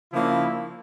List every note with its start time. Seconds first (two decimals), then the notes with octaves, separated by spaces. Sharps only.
0.12 C#3 F3 A#3 D4 E4